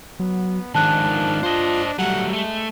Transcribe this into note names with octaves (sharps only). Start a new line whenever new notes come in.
F#3 B3
G#2 D#3 F3 D4 A5 F#6
F4 C5 D#5
F#3 G3 A3 F#5
G#3 A3